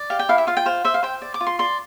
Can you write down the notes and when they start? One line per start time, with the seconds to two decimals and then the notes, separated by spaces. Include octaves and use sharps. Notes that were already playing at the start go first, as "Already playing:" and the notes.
Already playing: D5
0.10 G4 F5
0.19 G5
0.29 E4 F5
0.38 E5
0.47 F4 F5
0.57 G5
0.66 C5 F5
0.84 C5 E5
0.94 F5
1.03 C5 G5
1.22 D5
1.34 D6
1.41 F4
1.47 C6
1.59 D5 C6